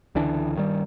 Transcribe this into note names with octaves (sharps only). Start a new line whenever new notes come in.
C#2 D3 E3 D4
G2 D#3 G3